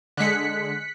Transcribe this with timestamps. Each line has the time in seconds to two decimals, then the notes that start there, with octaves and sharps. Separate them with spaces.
0.17 D3 G#3 F#6 B6 C#7